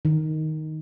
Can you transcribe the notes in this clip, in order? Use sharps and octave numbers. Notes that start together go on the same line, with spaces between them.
D#3